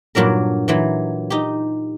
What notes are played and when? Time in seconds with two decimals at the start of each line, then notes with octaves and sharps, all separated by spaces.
0.15 G2 A#2 F#3 D4 A#4
0.68 A#2 E3 F#3
1.30 D#4 G4